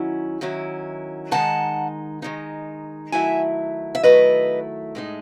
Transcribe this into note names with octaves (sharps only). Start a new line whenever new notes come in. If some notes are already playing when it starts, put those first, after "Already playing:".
Already playing: D#3 F#3 C#4 E4
D#3 F#3 C#4 E4
D#3 G#3 D#4 F#5 A5
D#3 G#3 D#4
D#3 F#3 A3 E4 E5 G#5
E5
D#3 F#3 A3 E4 B4 D#5
A2 G#3 D#4